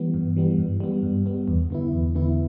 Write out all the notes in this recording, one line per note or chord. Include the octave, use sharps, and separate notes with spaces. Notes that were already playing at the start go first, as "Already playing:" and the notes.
Already playing: E3 G3 B3
G2
E3 G3 B3
G2
G3 B3
G2
G3 B3
E2
D3 B3 E4
E2
D3 B3 E4